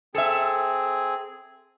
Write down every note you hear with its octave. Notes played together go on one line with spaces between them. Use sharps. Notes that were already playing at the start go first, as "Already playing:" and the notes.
C4 G#4 A4 E5